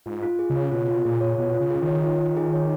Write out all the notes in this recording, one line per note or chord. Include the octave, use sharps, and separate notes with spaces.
G#2 F4
F4
G#4
C#3
C#5
B2 F4
F4
A#2 G#4
C#5
B2 F4
F4
C#3
G#4
D#3
C#5
F4
F4
G#4
C#5